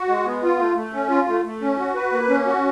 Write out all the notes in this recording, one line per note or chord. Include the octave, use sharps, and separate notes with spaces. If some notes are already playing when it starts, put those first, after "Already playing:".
Already playing: F#4
G#3
B3
F4
A3
A3
C#4
F4
A3
A3
C#4
F#4
B4
A#3
C#4
F#4